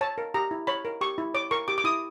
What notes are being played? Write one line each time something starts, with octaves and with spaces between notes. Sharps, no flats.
C#5 A5
A#4
G4 A#5
E4
C#5 B5
A#4
G4 C#6
E4
C#5 D6
A#4 C#6
G4 D6
D6
E4 D#6